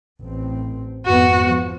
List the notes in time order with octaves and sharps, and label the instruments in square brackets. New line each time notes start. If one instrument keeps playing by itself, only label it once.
[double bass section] A1 C4
[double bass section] G#1 F2 B3 [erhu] F#4
[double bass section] F3